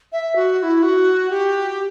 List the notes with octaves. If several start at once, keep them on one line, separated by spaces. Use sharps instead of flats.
E5
F#4
F#4
E4
F#4
G4